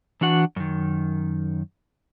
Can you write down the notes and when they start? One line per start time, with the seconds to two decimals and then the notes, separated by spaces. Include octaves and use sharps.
0.21 E3 D4 F#4 F#5
0.56 F#2 D#3